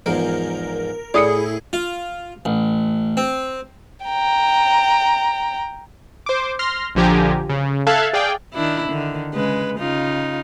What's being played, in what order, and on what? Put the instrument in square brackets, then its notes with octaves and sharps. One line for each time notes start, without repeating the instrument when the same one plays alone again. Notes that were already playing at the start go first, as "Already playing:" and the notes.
[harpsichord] E2 G#2 F3 [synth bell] A#4
[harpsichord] A2 [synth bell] E4 G#4 [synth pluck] D5 D#6 C#7
[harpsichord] F4
A1
C4
[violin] G5 A#5
[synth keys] C5 D6
C6 F6 A#6
A#1 D3 F3 G4 G#5 A#5
C#3
A4 E5 F5 A5 F#6 G#6
G#4 D5 F5 G5
[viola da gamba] D#3 D4 E4
D3 D#3
C#3 G#3 B4
C#3 D#4 F4